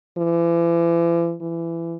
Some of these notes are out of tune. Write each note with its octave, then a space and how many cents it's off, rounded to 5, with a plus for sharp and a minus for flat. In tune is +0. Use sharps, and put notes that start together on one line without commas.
E3 +40
E3 +25